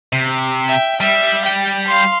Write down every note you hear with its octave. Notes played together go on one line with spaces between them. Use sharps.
C3
E5 G5
G3 E5
G5
F5 C6